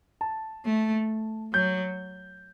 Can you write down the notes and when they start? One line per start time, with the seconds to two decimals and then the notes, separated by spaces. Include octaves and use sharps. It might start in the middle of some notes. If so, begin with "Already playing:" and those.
0.21 A5
0.65 A3
1.53 F#3 G6